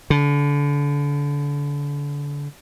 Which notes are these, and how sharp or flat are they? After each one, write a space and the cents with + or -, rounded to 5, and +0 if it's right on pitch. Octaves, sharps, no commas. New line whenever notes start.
D3 -35